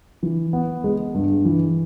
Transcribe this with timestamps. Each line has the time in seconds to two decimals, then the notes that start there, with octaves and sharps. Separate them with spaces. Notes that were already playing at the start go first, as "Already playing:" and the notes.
0.23 E3
0.53 B3
0.84 G#3
1.14 G2
1.45 E3